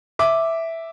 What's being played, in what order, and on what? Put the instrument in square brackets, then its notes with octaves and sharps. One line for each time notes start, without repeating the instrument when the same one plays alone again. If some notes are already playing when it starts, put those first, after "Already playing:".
[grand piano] E5 D6